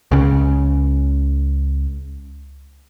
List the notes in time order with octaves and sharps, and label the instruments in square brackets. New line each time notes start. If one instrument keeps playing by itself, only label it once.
[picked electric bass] C#2 C#3